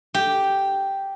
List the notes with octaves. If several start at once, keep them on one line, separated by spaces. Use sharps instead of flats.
G4